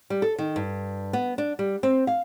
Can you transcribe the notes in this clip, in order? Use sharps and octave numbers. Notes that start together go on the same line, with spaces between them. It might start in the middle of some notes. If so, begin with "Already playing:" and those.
G3
A4
D#3
G2
B3
D4
G3
C4
F5